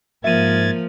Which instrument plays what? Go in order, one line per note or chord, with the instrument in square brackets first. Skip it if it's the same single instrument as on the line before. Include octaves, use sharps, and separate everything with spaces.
[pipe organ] G#2 G#6 A6 [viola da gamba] F3 [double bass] A#3 [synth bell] E5 D#7